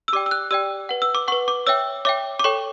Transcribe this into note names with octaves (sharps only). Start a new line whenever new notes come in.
E6
G4 D5 G5 D6
E6
F#6
G4 D5 G5 E6
B4 F#5
E6
D6
B4 F#5 C#6
D6
C#5 E5 G5 E6
C#5 E5 G5 D6
D6
A4 C#5 G5 C#6